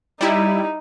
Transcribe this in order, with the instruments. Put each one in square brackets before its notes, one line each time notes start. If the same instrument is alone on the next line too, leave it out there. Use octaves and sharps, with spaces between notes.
[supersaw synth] G3 E4 [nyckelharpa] D#4